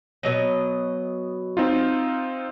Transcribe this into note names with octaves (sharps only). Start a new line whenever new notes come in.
B2 F#3 D#5
C4 D#4 F4